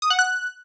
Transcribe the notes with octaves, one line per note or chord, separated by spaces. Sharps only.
D#6
F#5
F#6